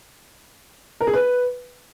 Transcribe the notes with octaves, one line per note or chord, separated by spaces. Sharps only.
A#4
G#4
B4